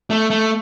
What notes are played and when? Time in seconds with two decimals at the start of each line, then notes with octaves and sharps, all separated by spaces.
0.10 A3
0.30 A3